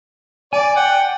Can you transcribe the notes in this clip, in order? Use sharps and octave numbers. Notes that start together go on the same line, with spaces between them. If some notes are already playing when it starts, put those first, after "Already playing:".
D5 G#5
F#5 G5